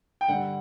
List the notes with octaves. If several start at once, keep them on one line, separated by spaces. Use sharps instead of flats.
G5
G2 D3 G3 F#5